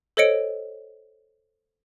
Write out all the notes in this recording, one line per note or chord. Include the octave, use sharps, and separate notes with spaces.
A4 C5 C#5 D#5 C#7 D7